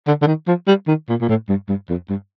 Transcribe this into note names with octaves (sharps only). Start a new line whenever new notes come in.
D3
D3
D#3
F3
G3
D#3
A#2
A#2
A2
G2
G2
F2
G2